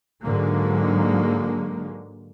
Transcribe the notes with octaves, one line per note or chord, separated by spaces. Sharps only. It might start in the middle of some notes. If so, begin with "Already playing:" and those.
G#2 D3 F#3 G#3 A#3